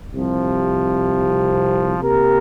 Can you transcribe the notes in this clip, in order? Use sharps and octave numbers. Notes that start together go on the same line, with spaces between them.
C2 C3 F3
C3 A#3 G4 A#4